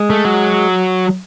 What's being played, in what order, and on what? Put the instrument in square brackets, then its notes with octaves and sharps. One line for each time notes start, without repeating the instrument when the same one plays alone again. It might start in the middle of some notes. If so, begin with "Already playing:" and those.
Already playing: [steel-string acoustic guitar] G#3
[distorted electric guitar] A3
F#3